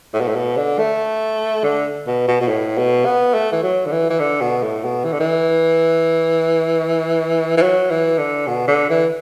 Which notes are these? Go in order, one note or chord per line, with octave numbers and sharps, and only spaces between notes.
A2
B2
A2
B2
D3
A3
D3
B2
B2
B2
A2
B2
B3
A3
E3
F#3
D3
E3
E3
D3
B2
A2
B2
E3
D3
E3
E3
F#3
E3
D3
B2
D3
E3